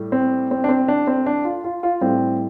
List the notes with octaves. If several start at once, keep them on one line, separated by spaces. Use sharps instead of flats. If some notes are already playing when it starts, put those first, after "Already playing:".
Already playing: A2 G3
C4
C4
D4
C4
D4
C4
D4
F4
F4
F4
A2 G3 C4